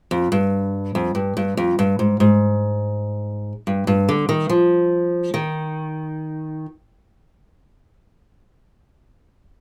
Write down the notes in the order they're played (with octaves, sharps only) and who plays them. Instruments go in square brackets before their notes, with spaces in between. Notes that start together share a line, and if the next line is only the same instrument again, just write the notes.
[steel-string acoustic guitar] F2
G2
F2
G2
G2
F2
G2
G#2
G#2
G2
G2
D3
D#3
F3
D#3